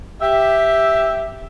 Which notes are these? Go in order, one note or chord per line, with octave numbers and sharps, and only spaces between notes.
G4 E5